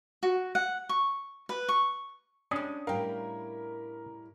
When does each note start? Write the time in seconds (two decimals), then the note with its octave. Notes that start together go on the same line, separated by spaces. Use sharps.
0.23 F#4
0.55 F#5
0.89 C#6
1.49 B4
1.69 C#6
2.51 G3 G#3 C#4 D4 D#6
2.87 A2 G3 E4 A#4 F5 G5